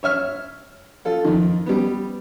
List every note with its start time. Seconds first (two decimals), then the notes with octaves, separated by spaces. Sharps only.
0.03 C#5 E5 F6
1.05 F4 A4
1.25 F2 D#3
1.66 G3 B3